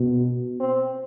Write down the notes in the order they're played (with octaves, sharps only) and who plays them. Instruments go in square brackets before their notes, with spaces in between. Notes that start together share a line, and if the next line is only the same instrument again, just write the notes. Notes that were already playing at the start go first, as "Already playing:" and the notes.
Already playing: [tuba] B2
[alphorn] C4